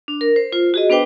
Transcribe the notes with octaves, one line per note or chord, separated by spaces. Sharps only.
D4
A#4
C5
F4 C5
F#4 G#4 D#5
B3 D4 B4 C5 G5 D6